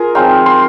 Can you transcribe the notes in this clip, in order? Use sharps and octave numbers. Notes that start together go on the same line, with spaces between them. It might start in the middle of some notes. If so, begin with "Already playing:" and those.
Already playing: F4 G#4 A#4
F3 G#3 C4 D#4 F5
C6